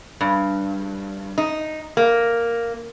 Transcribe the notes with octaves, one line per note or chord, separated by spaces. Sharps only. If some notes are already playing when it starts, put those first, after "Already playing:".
G2
D#4
A#3